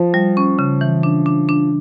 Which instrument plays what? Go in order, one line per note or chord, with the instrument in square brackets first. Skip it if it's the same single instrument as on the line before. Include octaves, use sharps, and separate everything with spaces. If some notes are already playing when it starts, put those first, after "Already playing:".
Already playing: [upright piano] F3
[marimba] G3
C#4
C#3
E3
D4
D4
D4